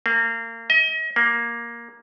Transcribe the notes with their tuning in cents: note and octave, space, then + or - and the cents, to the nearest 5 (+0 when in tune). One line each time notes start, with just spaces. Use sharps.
A#3 -30
D#5 +35
A#3 +10